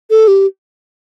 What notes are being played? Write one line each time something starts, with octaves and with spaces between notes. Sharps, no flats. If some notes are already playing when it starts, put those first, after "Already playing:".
A4
G4